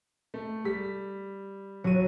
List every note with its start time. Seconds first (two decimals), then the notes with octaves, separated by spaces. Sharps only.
0.34 A3
0.65 G3 B6
1.84 G1 F#3 D#7